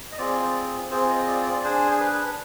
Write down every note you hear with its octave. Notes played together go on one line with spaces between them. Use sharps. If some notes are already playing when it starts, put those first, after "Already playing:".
D#5
C4 F4 G#4 D5
C5
C4 F4 G#4 C5
D#5
D5
D5
D4 G#4 C5
G#4
B4